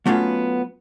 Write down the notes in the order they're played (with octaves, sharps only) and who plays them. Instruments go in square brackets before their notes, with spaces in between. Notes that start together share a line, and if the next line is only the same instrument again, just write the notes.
[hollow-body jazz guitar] F#3 A3 B3 C#4 F4